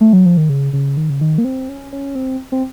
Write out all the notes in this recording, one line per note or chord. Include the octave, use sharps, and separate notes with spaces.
A3
F#3
F3
D#3
C#3
C#3
D#3
C#3
D#3
A#3
C4
C#4
C#4
C4
C4